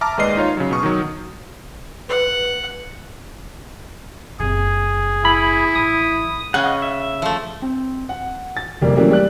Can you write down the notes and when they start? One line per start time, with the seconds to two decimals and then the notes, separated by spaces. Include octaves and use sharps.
0.01 E5 A5 A#5 D6 F6
0.17 D#2 G#3 B4 D5 D#5 C7
0.37 D#4 F4 C#5
0.57 C#3 F#3
0.71 B2 C#6 D#6
0.83 D#3 F#3
2.09 B4 F#5
4.39 F#1 C3 G#4
5.25 E4 B5
5.75 A1 D#6
6.54 C#3 C#4 F#5
6.66 D#5
6.82 E5
7.22 F3 A3
7.62 C4
8.09 F#5
8.57 A6
8.82 F1 G3 A#3
8.96 C#3 E3 F#3 G3 A3 A#3
9.11 G3 F#6 F#7